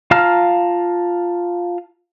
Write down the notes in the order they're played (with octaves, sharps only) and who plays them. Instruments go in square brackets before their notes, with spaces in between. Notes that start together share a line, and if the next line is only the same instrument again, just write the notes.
[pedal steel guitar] F4 F5 A5 A#5 F6